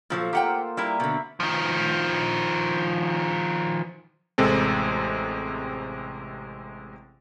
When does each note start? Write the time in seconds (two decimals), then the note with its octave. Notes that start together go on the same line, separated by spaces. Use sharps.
0.10 A#2 F3 F#3 F4 A4 C5
0.33 A#3 F4 G4 C5 F#5 G5
0.77 G3 E4 A#4 E5
1.00 B2 D3 B5
1.40 D#3 F3
4.38 A1 C3 G#3 C4 A4